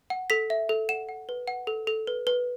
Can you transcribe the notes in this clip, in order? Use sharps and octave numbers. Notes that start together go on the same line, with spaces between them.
F#5
A4 B6
E5
A4
F#5 E7
F#5
B4
F#5
A4
A4
B4
B4